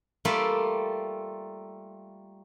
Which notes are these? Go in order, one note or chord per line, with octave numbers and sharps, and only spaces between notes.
G3 A3 A#3 F4 D5 E5